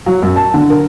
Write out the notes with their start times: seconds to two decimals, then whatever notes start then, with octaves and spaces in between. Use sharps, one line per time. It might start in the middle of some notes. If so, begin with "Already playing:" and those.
0.06 F#3
0.22 F#2
0.36 A5
0.54 D3
0.70 A#4